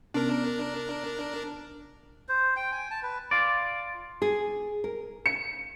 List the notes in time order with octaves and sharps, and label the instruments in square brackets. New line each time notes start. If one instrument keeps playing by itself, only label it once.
[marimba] C3 B3 C#4 [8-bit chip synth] D4 A#4
[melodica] C5
G5
G#5
A5
B4
[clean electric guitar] F4 D5
[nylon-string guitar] G#4
A#4
[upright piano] C#7